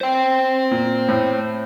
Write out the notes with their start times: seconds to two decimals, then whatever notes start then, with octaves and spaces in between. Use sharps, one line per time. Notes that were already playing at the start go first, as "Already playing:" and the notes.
0.01 C5 G5
0.71 A#2
1.08 A2